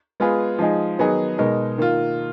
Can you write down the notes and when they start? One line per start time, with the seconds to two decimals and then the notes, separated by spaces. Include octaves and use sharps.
0.20 G#3 B3 F4 G#4 B4
0.59 F3 G#3 D#4 G#4
0.98 D#3 F#3 B3 D#4 G#4
1.38 B2 G#3 D#4 A#4
1.78 D#3 A#3 F4